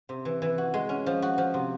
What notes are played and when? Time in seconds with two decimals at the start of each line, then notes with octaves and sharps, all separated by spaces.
0.09 C3
0.25 E3
0.42 E3
0.58 F#4
0.74 G#3
0.89 C#4
1.06 F3
1.22 F#4
1.38 F3
1.54 C3